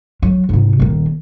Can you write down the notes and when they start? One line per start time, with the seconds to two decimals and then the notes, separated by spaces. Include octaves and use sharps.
0.23 F#3
0.49 G#2 C3
0.79 D#1 D#3